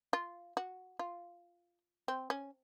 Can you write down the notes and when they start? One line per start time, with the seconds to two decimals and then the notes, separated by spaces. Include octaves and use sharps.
0.13 F4
0.57 F#4
0.99 F4
2.08 C4
2.30 C#4